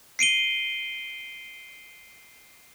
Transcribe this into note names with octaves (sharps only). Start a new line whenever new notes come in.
C7 D7 D#7 G7